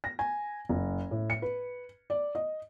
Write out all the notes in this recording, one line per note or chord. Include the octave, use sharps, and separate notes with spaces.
A#6
G#5
F#1
A2
C#7
B4
D5
D#5